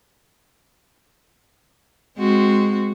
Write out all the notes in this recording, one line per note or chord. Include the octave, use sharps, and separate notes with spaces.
G#3 C4 F#4